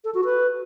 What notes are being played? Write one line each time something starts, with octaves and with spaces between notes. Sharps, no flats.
A4
F#4
B4